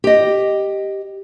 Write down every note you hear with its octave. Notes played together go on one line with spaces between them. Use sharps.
G4 D#5